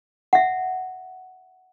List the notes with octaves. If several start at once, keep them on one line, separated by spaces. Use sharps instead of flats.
E5 F#5